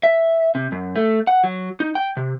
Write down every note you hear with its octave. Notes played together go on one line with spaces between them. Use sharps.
E5
C3
F#2
A3
F#5
F#3
D#4
G5
C3